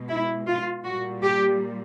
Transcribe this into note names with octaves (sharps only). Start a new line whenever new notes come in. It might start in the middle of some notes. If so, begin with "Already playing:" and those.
Already playing: B2 G#3
E4
F4
A#2 G3 F#4
G4